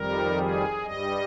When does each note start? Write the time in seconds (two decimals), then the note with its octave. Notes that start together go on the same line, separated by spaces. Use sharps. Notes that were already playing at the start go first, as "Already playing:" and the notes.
Already playing: F2 D#3 G3 A#4
0.37 G#4
0.83 G2 G3 D#5